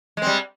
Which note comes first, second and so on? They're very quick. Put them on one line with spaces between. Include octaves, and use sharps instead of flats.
G#3 C4 G3